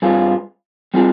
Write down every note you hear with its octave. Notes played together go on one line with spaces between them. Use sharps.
G2 G3 C4 F4 G#4
G3 C4 F4 G#4